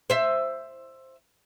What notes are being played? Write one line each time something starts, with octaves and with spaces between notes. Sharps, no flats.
C5 E5